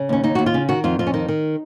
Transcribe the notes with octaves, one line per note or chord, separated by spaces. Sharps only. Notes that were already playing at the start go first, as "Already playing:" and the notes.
Already playing: C#3
D#2 C#4
D#2 D#4
D#2 F#4
F4
C#3
D#3 F#4
F2 F4
F2 F4
C#4
D#3 D#4
D#3